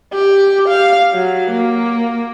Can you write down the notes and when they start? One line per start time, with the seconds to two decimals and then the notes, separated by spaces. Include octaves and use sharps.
0.13 G4
0.68 F5
1.14 F#3
1.51 A#3